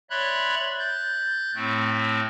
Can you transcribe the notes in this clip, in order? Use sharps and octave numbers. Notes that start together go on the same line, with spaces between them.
C#5 D5 E5 B5 C6 F#6
F#6 G6 A6
A2 A3 C4